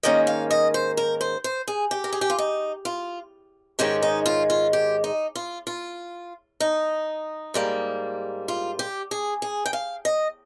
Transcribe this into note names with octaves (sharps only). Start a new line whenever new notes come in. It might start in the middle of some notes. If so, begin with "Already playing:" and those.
G#2 D#3 A#3 C#4 D#5
F5
D#5
C5
A#4
C5
C5
G#4
G4
A#4
G#4
G4
F4
D#4
F4
G#2 D#3 G#3 C#4 G4
D#4
F4
F4
G4
D#4
F4
F4
D#4
G#2 G3 A#3
F4
G4
G#4
G#4
G5
F5
D#5